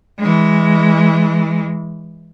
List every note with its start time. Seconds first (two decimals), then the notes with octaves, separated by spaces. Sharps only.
0.19 E3 G#3